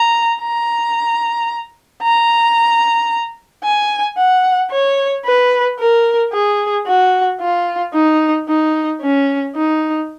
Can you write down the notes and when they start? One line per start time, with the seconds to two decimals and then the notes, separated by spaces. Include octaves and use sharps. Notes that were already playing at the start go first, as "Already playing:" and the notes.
Already playing: A#5
0.40 A#5
2.03 A#5
3.64 G#5
4.17 F#5
4.71 C#5
5.25 B4
5.79 A#4
6.32 G#4
6.86 F#4
7.41 F4
7.93 D#4
8.48 D#4
9.01 C#4
9.56 D#4